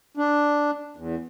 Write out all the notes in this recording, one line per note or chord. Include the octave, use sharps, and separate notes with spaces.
D4
E2